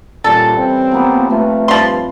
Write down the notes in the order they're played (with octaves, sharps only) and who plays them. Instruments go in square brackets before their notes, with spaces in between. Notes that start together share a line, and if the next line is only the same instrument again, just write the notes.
[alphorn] A#2 [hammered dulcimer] E3 G3 C#4 [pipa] A4
[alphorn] C4
[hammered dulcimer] F3 A#3 [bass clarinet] B3
[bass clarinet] A3 [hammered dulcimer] C4 B4 A#5 [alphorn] F4
[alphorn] G2 [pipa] F3 C6